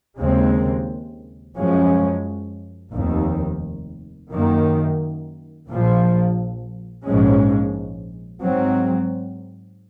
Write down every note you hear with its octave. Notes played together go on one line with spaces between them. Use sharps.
D#2 C#3 G#3 C4
F#2 F3 G#3 C#4
F1 D#2 D#3
F#2 D#3 A#3
A#1 A#2 F3
A#1 G#2 F3 G#3 C#4
G#2 F#3 C4